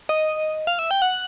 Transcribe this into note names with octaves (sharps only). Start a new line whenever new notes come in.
D#5
F5
E5
G5
F#5